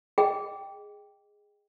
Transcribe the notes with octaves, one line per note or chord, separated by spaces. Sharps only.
G#4 D#5 G5